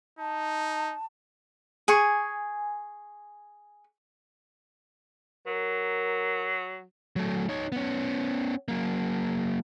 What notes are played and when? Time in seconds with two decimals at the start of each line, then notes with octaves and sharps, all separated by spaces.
0.19 D#4 A5
1.88 G#4 G#5 C#6
5.47 F#3 A#4
7.16 F#3 A3
7.49 D#4 C#5
7.72 B3 C#4
8.68 F#3 A#3